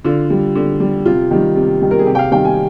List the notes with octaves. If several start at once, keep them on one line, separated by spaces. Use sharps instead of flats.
D3 F4
G3
D3
G3
C3 F4
D#3 G3
C3
D#3 G3
A#4
G#4
C3 G4
G5
F5
D#3 G3 G5
G#5